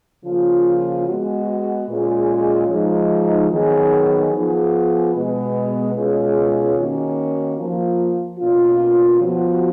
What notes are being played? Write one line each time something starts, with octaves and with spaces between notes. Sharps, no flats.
C#3 F3 A#3 F4
G#3 B3 F#4
A#2 G#3 C#4 F4 G#4
F3 G#3 D#4
D#3 F#3 B3 D#4 G#4
F3 B3 F4 G#4
B2 G#3 B3
B2 G#3 C#4 F4 G#4
D#3 A#3 C#4 F#4
F3 A#3 F4
B2 A#3 C#4 F4
F3 B3 F#4